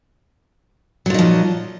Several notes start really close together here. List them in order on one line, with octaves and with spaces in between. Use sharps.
F#3 A#2 D#4 F3